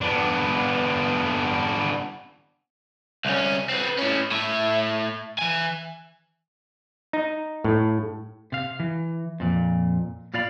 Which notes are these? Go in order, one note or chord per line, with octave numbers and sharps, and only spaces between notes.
B3 D4
C2 C#4
C4 B4
A2 C#4
A2 E5
E3 G#5
D#4
A2
C3 F5
E3
F2 A#2
A#2 F4 D5 F5 B5